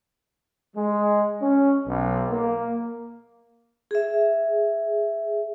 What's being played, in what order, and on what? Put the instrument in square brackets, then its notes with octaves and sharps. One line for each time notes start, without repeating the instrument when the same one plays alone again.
[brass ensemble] G#3
C#4
B1
A#3
[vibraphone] G#4 E5